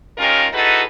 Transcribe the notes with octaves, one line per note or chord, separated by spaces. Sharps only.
D#3 G#3 C#4 F4 G4 A#4
D#4 E4 F#4 G#4 A4 B4